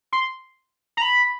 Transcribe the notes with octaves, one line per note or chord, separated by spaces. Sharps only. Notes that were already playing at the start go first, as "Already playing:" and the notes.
C6
A#5
B5